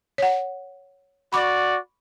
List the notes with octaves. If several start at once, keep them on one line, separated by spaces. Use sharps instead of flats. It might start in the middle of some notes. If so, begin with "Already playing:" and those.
C#5 F#5
F#4 D5 B5 C#6 D6